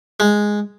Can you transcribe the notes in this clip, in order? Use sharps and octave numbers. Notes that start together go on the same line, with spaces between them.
G#3